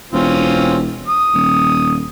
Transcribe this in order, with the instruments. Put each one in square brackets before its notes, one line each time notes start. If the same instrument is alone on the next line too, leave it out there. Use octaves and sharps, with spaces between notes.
[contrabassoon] E1 [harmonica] C4 C#4 F4
[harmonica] D#6
[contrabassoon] D#1